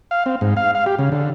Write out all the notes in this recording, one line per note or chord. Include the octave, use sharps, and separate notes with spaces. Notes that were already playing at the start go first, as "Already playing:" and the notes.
F5
C4
G#2
F5
F5
G4
C#3
D3